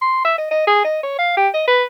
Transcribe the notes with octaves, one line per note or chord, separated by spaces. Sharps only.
C6
E5
D#5
D#5
G#4
D#5
C#5
F5
G4
D#5
B4